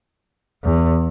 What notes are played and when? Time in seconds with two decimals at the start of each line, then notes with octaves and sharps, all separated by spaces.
0.64 E2